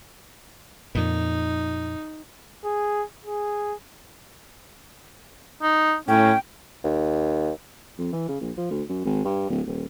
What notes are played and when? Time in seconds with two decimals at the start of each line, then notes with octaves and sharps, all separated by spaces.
0.95 F2 A#2 D#4
2.64 G#4
3.25 G#4
5.63 D#4
6.08 A2 C#4 G5
6.84 D#2
7.98 F2
8.12 E3
8.28 C#3
8.41 A#1
8.57 F3
8.70 D2
8.89 F#2
9.05 G#1
9.24 G2
9.50 D1
9.67 D#1